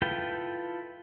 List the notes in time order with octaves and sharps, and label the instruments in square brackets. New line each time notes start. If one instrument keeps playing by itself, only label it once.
[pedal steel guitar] E4 F4 A4 B4 G5